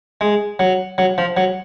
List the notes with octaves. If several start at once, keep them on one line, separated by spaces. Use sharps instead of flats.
G#3
F#3
F#3
F3
F#3